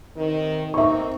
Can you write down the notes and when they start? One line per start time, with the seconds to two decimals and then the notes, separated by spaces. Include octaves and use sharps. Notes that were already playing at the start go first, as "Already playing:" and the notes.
0.16 C3 D#3
0.74 A#3 C4 D#4 E5 C#6